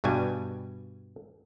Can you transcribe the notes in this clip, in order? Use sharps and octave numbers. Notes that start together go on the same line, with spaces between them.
G2 B2 G3 G#5